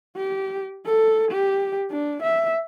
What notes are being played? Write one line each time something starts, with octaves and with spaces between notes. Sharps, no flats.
G4
A4
G4
D4
E5